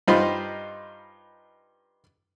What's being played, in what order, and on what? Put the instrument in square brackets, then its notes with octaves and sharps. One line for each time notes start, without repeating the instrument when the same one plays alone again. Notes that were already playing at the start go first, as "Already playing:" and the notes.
[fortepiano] G2 D#4 F4 C5 B5